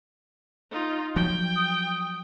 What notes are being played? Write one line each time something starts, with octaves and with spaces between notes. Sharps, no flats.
D#4 F4
F3 F#3 G5
D#6